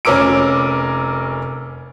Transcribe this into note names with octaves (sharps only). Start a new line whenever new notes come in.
F1 C#4 A#4 D6 E6 D7